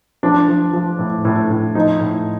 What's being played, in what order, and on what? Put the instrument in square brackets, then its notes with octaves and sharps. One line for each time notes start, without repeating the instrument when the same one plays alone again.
[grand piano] F3 D4
F3
F3
A2
A2
A2
F3 D#4
A2